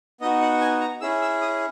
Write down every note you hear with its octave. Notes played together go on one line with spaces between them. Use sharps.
B3 D#4 F#4 D#5
F#5
G#5
A#5
C#4 E4 G#4 E6
E6
D#6